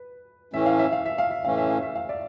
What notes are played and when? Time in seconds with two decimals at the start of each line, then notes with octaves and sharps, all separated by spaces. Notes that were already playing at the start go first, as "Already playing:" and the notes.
Already playing: B4
0.53 A2 E3 A3 C#4 E5
0.66 F5
0.79 E5
0.93 F5
1.06 E5
1.18 F5
1.31 E5
1.45 A2 E3 A3 C#4 F5
1.58 E5
1.70 F5
1.83 E5
1.96 F5
2.09 D5 E5